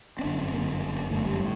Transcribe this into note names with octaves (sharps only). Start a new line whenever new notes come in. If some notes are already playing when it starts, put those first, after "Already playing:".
C4
G1 F#2 D3 D4
C4
G1 F#2 D3 A#3
G1 F#2 D3
G1 F#2 D3 A3
G3
A2